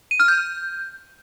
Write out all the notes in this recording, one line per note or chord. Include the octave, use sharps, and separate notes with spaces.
D#7
F6
G6